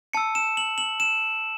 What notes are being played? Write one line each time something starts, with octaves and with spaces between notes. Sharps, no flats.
A5 E6 C#7
E7
F#7
F#7
E7